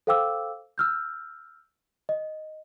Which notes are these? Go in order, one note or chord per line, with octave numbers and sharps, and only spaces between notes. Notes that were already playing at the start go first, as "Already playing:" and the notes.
A4 C5 F5 G5 D6 E6
E6 F6 G6
D#5